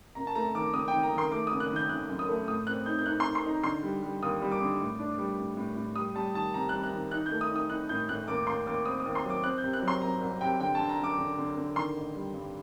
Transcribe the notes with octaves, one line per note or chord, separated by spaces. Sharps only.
F#1 A#5
A5
A3 A#5
D#3 D6
F#1 D#6
G5
D#3
A#5
D#3 C6
A3 D6
F#1 D#6
F#6
D#3
G6
D#3 F#6
F#2
D#6
A3
A2 D#6
C4 F#6
D#4 G6
G6
D#4 F#6
C6
D#4
C6
D#4 A#5
D3 C6
G3
G3
D#2 D#6
G3
D6
D3
A2
D4
G3
A2
A2
A2
G3 D#6
G3 A5
D#3 A5
C3 A#5
G3 F#6
F#6
D#3
D#4 F#6
G6
A3
D#6
D#4
D#6
D#4 F#6
A2 G6
A2 F#6
D#2 D6
D#2 C6
D#2 D6
C4 D#6
D#6
D#2
C6
F#3 D6
C4 F#6
G6
C3
F#6
F#3
C6
F#3 A#5
C2
C3 G5
D3 G5
D3 A5
A#5
F#2 D6
D3
D3
D3
D#3 C6
A1
G3
G2